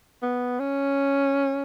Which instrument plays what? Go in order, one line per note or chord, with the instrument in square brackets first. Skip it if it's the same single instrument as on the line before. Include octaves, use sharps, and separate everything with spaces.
[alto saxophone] B3
C#4